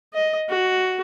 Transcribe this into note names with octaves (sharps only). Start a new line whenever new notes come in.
D#5
F#4